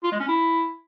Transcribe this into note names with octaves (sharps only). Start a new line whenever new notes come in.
F4
G#3
C#4
E4